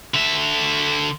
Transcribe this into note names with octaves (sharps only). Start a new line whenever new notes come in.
D3 E5